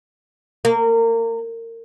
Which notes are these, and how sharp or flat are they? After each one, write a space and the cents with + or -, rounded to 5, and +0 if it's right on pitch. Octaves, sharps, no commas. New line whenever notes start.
A#3 -30